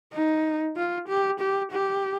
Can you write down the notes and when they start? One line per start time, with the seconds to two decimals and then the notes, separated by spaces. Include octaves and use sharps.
0.14 D#4
0.76 F4
1.08 G4
1.40 G4
1.72 G4